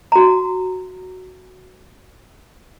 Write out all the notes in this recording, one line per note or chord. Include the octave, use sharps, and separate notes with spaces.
F#4 A#5